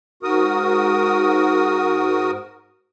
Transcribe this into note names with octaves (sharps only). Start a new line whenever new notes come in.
G#2 F#4 A#4 D#6